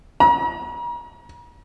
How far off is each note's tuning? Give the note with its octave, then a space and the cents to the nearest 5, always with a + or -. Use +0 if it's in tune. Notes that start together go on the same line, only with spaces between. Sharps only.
A#5 +40